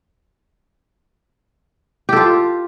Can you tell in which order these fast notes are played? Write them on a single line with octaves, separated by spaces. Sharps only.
G4 A4 F4